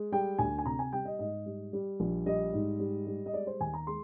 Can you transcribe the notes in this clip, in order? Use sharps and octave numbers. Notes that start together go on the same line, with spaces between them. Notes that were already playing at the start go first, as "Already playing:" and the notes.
Already playing: G#3
G3 G5
D2 G#5
G#5
C3 A#5
G#5
G3 G5
D#5
G#2 D#5
G3
G3
A#1
G3 D#5
G#2
G3
G3
D#5
G#3 D5
C5
D#2 G#5
A#5
G#3 C6